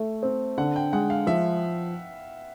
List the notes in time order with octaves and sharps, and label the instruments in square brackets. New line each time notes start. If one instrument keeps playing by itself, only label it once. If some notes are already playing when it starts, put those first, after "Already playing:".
Already playing: [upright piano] A3
C4
[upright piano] D3 [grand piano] F#5
[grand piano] G5
[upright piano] G#3 [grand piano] F#5
[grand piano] F5
[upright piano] F3 [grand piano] E5